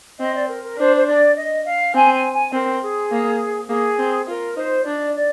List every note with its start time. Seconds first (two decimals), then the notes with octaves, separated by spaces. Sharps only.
0.20 C4 D#5
0.34 D5
0.48 A#4
0.63 A#4
0.78 D4 C5
0.96 C5
1.08 D5
1.36 D#5
1.65 F5
1.94 C4 G#5
2.14 G#5
2.33 G#5
2.53 C4 A#4
2.82 G#4
3.11 A#3
3.69 A#3 G#4
3.99 C4
4.27 F4 A#4
4.57 D#4 C5
4.86 D4 D5
5.15 D5